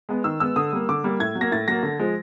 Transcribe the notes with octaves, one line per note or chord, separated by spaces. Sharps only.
G#3 B3
D#3 E6
G#3 B3 E6
D3 D#6
G3 A#3
D3 D6
G3 A#3
A2 G#6
F#3
A#3 A#6
A2 A6
F#3 A#3 A#6
D3
F3 G#3